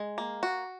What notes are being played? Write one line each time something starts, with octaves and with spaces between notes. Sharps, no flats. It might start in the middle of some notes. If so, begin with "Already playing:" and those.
Already playing: G#3
A#3
F#4